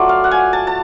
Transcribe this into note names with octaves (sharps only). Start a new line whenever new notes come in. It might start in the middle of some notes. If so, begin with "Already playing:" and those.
Already playing: F#3 A3 F4 D5
F5
F#5
G#5
A5
A5